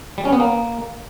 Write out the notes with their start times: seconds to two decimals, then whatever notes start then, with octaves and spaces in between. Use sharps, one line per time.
0.18 G3
0.25 C#4
0.33 B3
0.40 A#3